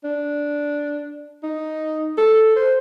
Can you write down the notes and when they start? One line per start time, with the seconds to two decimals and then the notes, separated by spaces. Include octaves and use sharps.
0.04 D4
1.43 D#4
2.18 A4
2.56 C5